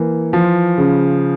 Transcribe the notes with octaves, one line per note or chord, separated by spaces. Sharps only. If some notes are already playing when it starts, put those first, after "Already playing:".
Already playing: E3 A#3
F3
C#3